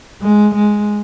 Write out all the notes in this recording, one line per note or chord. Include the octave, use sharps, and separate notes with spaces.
G#3
G#3